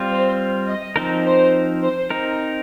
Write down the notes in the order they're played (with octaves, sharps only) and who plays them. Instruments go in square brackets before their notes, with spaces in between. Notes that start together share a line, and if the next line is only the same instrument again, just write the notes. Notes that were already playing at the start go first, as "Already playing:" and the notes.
Already playing: [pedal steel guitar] G3 C4 F4
[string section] C5
D#5
[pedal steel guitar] F3 C4 D#4 A#4
[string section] C5
C5
[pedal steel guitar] C4 D#4 A#4